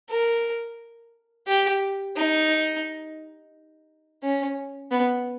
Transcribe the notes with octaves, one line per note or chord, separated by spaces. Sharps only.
A#4
G4
D#4
C#4
B3